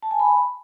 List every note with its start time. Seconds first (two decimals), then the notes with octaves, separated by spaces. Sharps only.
0.02 A5
0.11 G#5
0.20 B5